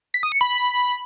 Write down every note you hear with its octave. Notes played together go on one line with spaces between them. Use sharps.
B6
D#6
C#7
B5